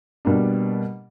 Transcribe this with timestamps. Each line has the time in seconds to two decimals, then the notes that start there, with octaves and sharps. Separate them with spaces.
0.25 B2 G3 A#3 D4